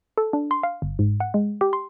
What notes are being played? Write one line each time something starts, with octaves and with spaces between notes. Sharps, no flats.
A4
D4
C6
F5
G1
G#2
F#5
G#3
G4
C6